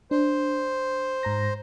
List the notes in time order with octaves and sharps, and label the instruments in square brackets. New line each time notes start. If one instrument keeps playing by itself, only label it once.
[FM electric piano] D4 [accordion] C5
[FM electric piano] G#2 A#5 A#6